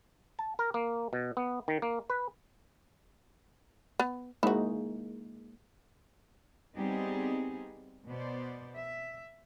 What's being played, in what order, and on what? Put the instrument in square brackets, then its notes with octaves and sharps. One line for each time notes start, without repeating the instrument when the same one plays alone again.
[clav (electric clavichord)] A5
A#4
A#3
B2
B3
D#3
A#3
B4
[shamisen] B3
[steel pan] G#3 A#3 D#4 [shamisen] E4 F#4
[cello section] G3 B3 C4 D#4 G4 G#4
B2 B3 C5 D5
E5